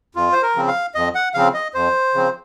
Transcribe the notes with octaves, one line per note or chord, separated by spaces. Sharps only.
F2 F4
C5
A#4
C#3 F3 C4
F5
F2 D#5
F#5
C#3 F3 C4 F5
D#5
F2 C5
C#3 F3 C4